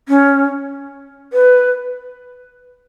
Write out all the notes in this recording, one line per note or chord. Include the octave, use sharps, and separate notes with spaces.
C#4
B4